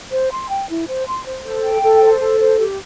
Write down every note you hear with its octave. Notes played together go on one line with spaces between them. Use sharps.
C5
C6
G5
E4
C5
C6
C5
A4
G5
A4
C5
A4
C5
G4